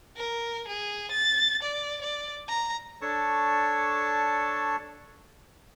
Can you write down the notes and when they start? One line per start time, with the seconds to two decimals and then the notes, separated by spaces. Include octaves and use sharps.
0.17 A#4
0.68 G#4
1.11 A6
1.62 D5
2.01 D5
2.49 A#5
3.02 D4 A4 C#5 A5 C#6